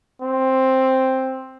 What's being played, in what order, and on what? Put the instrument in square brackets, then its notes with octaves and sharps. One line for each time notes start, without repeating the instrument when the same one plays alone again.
[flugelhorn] C4